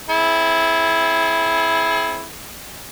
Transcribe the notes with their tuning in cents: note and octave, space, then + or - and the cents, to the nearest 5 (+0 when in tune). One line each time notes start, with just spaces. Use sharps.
C4 +5 E4 -5 G#4 +35